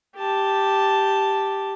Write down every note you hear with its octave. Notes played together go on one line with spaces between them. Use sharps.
G4 A5